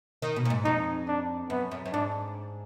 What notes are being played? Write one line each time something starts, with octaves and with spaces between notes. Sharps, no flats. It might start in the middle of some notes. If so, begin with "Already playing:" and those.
D#3
B2
A#2
G#2
F2 D#4
D4
F#2 B3
F#2
F#2
G#2 D4